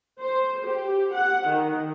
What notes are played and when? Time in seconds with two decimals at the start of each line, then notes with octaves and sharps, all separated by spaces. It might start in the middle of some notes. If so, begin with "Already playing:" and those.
0.20 C5
0.66 G4
1.13 F#5
1.48 D#3